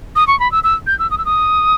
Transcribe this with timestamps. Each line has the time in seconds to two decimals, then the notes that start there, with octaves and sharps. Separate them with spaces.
0.16 D#6
0.27 C#6
0.40 B5
0.52 E6
0.64 E6
0.87 G6
0.99 E6
1.11 D#6
1.18 E6
1.25 D#6